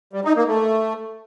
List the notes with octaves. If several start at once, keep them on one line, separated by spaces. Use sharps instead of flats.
G3
D#4
A#3
A3